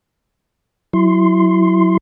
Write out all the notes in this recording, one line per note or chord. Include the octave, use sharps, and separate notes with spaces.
F#3 E4 C6